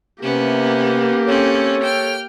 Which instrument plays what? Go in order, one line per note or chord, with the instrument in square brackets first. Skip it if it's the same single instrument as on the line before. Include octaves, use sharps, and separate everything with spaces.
[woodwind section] C3 [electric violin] A#3 G4 [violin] B3 C#4
[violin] C4 C#4 [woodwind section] A4 C#5
[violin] G5 F6